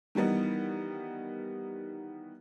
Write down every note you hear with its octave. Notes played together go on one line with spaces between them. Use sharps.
D#3 E3 G3 B3 D#4